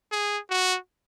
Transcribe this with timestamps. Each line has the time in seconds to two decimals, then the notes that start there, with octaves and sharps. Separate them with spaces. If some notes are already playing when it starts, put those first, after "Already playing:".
0.12 G#4
0.50 F#4